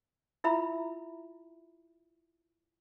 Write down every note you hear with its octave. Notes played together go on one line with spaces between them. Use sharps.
E4 F4 E5 A#5 B5